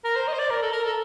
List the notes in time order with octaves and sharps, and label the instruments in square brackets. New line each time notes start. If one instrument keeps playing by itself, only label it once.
[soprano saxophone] A#4
C5
D#5
C5
D5
A#4
A4
A#4
A4